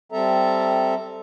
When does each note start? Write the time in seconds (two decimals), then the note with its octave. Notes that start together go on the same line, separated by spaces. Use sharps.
0.12 G3 C4 A4 E5 A#5